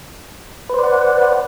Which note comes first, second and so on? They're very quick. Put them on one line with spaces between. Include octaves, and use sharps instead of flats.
B4 C5 D5 F#5